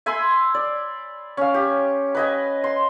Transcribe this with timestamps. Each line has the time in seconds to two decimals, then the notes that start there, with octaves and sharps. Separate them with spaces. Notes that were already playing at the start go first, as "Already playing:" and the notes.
0.06 E5 G#5 B5 C6
0.55 D5
1.37 C#4 F5
1.54 G4
2.15 B4 D#5 G#5
2.64 C6